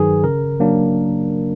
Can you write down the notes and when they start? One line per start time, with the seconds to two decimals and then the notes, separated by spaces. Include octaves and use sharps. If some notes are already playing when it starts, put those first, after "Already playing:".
Already playing: G2 D#3 F#3 G#4 B4
0.24 C#3 A#4
0.60 F#3 A#3 D4